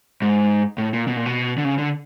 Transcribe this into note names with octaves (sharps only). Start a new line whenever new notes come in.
G#2
A2
A#2
B2
A#2
B2
D3
C#3
D3